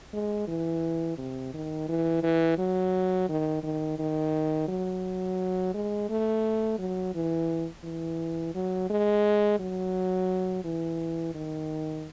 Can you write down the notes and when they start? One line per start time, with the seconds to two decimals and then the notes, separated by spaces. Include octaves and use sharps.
0.13 G#3
0.47 E3
1.18 C3
1.54 D#3
1.89 E3
2.23 E3
2.58 F#3
3.29 D#3
3.63 D#3
3.99 D#3
4.68 F#3
5.74 G#3
6.09 A3
6.79 F#3
7.15 E3
7.84 E3
8.54 F#3
8.90 G#3
9.59 F#3
10.64 E3
11.35 D#3